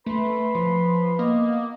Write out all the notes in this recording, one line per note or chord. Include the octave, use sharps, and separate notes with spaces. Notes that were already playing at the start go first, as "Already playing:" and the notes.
A3 B4 B5 C6
F3
A#3 B3 D#5